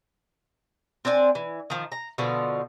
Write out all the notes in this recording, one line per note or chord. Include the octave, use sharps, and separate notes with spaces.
C4 D4 D5 G#5
E3
D#3 F3
A#5
B2 D3 F3 F4